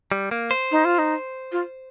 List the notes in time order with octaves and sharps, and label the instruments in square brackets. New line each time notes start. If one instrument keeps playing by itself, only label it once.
[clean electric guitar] G3
A#3
C5
[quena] D#4
F4
D#4
F4